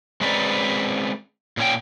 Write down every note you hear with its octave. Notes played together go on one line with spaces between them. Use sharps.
G#3 C4 C#4 B4 D5 A#5
A#2 C#4 G5